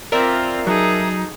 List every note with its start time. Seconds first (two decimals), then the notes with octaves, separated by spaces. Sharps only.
0.12 C4 F4 A#4 D5 E5
0.67 F#3 D#4 G#4 A4